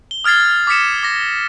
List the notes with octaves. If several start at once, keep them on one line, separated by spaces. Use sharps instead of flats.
G7
D#6 F6 G#6 A6 C7
D6 D#6 B6 C#7 E7
D6 A#6